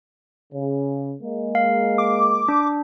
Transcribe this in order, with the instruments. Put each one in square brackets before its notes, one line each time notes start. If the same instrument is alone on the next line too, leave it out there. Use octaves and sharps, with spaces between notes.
[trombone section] C#3
G#3 A#3
[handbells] F5
[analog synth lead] D6
[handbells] D4